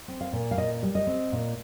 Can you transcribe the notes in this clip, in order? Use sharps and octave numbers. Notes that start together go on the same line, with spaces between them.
C4
F5
A#2
F5
A#2 D#5
G3
D#5
C4
A#2